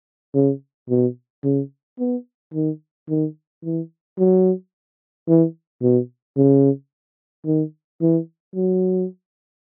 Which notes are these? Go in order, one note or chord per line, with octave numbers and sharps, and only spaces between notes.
C#3
B2
C#3
B3
D#3
D#3
E3
F#3
E3
B2
C#3
D#3
E3
F#3